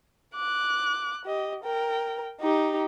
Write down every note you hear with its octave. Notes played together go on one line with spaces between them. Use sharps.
D6 F#6
G4 D#5
A#4 G5
D#4 G4